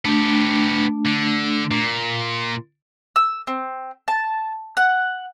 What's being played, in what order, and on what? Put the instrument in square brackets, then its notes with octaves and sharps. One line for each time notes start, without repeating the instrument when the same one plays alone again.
[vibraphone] A3 D4 [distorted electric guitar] B3 G4
[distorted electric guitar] D3
A#2
[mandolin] E6
C4
A5
F#5